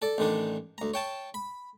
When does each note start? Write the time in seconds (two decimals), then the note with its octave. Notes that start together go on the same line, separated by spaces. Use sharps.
0.02 A4 D5
0.18 A1 D3 D#3 D4
0.78 D2 A#5
0.94 C#5 G5 A5
1.34 B5